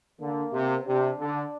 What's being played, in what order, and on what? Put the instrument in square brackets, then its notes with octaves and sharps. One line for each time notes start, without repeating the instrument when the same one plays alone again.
[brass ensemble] D3 [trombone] A#3
[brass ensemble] C3
[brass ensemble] C3 [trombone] D4
[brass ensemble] D3